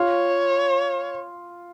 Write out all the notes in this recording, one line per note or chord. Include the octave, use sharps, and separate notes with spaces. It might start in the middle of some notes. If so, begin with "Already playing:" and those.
Already playing: F4 C#5